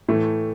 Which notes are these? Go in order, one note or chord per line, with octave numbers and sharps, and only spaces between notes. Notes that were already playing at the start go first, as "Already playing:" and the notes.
A2 E3 A3